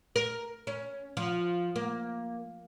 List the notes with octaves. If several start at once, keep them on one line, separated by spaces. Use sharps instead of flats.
A#4
C#4
F3
A#3